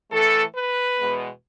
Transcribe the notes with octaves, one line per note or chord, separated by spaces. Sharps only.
A2 E3 A3 A4
B4
E2 B2 G#3 B3